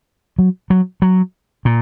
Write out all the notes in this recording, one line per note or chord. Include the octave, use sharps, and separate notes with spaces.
F#3
F#3
F#3
A#2